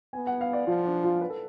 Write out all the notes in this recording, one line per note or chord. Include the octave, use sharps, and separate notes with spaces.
B3 G#5
F#5
F5
D5
F3 F4
D4
F4
B4
A4